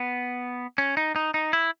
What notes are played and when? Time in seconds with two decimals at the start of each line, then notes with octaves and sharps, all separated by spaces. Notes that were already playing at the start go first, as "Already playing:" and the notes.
Already playing: B3
0.78 C#4
0.97 D#4
1.16 D#4
1.34 D#4
1.53 E4